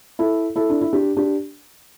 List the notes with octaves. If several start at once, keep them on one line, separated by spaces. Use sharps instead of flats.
E4 A4
E4 A4
D4
E4
D4 G4
D4 G4